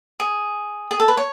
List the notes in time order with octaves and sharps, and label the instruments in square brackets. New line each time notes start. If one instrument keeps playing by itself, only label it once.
[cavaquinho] G#4
G#4
A4
B4
C#5